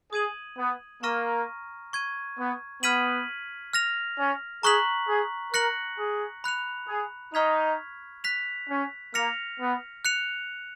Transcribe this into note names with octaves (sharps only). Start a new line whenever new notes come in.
G#4 D#6 G#6 D#7 F#7
B3
A#3 A#5 C#6 F6 A#6 D#7
C#6 G#6 D#7
B3
B3 F6 G#6 B6 D#7 F#7
F6 A#6 F7
C#4
G#4 A#5 C#6 F#6 B6 F#7
G#4
A#4 F#6 A#6 C#7 F#7
G#4
B5 F#6 C#7 F7
G#4
D#4 C#6 F6 G#6 B6 F7
F#6 B6 F7
C#4
A#3 F6 A#6 C#7 F7
B3
F#6 C#7 F7